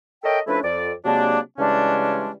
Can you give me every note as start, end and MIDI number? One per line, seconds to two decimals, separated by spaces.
0.23 0.40 69
0.23 0.40 70
0.23 0.40 73
0.23 0.40 75
0.23 0.40 76
0.23 0.40 79
0.47 0.59 53
0.47 0.59 57
0.47 0.59 61
0.47 0.59 62
0.47 0.59 64
0.47 0.59 71
0.64 0.92 41
0.64 0.92 74
1.05 1.39 48
1.05 1.39 54
1.05 1.39 56
1.05 1.39 58
1.05 1.39 62
1.59 2.31 49
1.59 2.31 52
1.59 2.31 55
1.59 2.31 56
1.59 2.31 61
1.59 2.31 62